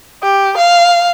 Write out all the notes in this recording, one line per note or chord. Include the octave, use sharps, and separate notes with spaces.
G4
F5